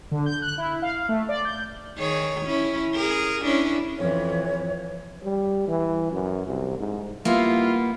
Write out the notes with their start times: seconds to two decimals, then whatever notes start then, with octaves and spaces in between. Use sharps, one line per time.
0.11 D3
0.26 G6
0.42 F#6
0.58 E4
0.82 F5
0.95 F5
1.09 A3
1.29 D5
1.45 G6
1.97 D#3 G#4 C#5
2.45 C#4 E4
2.94 G#4 A#4
3.44 C#4 D4 E4
3.98 F2 E3 C#5
5.24 G3
5.68 E3
6.12 F#2
6.47 C2
6.78 G#2
7.25 G3 A#3 B3 E4 F4